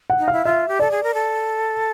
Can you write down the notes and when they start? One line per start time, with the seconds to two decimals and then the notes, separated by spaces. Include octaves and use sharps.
0.10 F#5
0.19 D#4
0.28 E4 F5
0.45 F4 E5
0.68 G4
0.79 A4 D5
0.91 G#4
1.03 A#4
1.14 A4